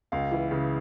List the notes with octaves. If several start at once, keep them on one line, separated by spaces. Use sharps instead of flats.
C#2 F5
E3
C#3